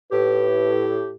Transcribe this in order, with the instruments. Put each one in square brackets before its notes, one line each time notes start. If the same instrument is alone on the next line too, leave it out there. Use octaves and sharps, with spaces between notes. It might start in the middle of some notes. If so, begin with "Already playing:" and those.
[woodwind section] A2 G4 [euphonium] B4